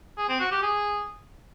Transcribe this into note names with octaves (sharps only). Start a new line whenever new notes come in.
G#4
C4
F#4
G4
G#4